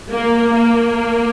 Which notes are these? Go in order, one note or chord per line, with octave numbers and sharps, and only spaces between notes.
A#3
A#3